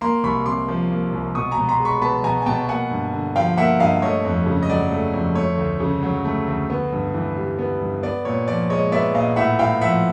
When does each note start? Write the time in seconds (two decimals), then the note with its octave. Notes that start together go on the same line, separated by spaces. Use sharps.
0.01 A#3 A#5 C6
0.23 C2 B5 C#6
0.46 C3 C6 D6
0.68 F3
0.91 A#3
1.12 C2
1.35 B2 C#6 D#6
1.51 G#5 A#5
1.57 B2
1.69 A#5 C6
1.80 G#3
1.85 B5 C#6
2.01 B3 A5 B5
2.24 B2 G#5 A#5
2.42 G#5
2.46 B2 G5 A5
2.69 A#3 F#5 G#5
2.91 G2
3.13 D3
3.36 F3 F5 G5
3.57 A#3 E5 F#5
3.80 G2 D#5 F5
4.02 A3 C#5 D#5
4.25 F2
4.46 C#3
4.63 D#5
4.70 F#3 D5
4.91 A3
5.14 F2
5.35 A3 C#5
5.58 D2
5.80 C#3
6.03 F#3
6.25 A3
6.47 D2
6.70 B3
6.92 G2
7.14 E3
7.37 G3
7.59 B3
7.81 G2
8.03 B3 D5
8.25 A#2 C#5
8.48 F3 D5
8.70 G#3 C#5 D#5
8.92 B3 D5 E5
9.15 A#2 D#5 F5
9.36 A2 E5 F#5
9.59 A2 F5 G5
9.81 F3 E5 F#5